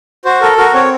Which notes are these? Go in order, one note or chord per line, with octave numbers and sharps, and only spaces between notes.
F#4 C5
A4 A#4
F#4 A#4
C4 C#5